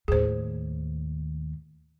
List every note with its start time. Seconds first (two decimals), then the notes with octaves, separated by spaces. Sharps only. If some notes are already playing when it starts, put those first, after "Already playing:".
0.08 D#2 A2 G#4 C5